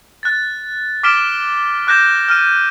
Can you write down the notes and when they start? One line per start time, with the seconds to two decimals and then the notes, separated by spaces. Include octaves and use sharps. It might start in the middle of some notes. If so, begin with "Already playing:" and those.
0.23 F#6 A6
1.03 D6 F6 B6 D7 E7 G7
1.87 D6 F#6 G6 A#6 E7
2.28 F6 D#7